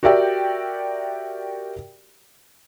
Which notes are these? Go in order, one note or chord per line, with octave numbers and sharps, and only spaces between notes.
F#4 G4 A#4 D5 E5 G5